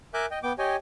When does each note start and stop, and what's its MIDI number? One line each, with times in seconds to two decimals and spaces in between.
0.14 0.26 70
0.14 0.26 76
0.14 0.26 80
0.14 0.26 86
0.14 0.26 90
0.14 0.26 91
0.31 0.39 75
0.31 0.39 79
0.43 0.53 59
0.43 0.53 79
0.43 0.53 86
0.59 0.76 67
0.59 0.76 73
0.59 0.76 75
0.59 0.76 79
0.59 0.76 80